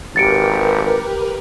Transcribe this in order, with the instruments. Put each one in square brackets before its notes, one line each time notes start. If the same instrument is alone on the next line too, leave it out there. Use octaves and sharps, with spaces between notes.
[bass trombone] G#1 [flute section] G4 [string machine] A#4 B4 [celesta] A6 C#7 D7